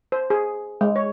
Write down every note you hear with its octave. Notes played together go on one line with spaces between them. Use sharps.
C5
G#4
G#3
C#5